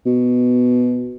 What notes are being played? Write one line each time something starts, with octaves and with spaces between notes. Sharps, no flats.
B2